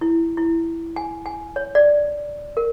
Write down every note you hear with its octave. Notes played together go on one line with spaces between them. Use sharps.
E4
E4
G#5
G#5
C#5
D5
A#4